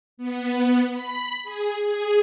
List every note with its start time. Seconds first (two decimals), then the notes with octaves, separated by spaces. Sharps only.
0.17 B3
0.88 B5
1.43 G#4
1.84 G#4